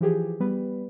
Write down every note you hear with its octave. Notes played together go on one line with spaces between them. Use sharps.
E3 F3 G4 G#4
G3 B3 B4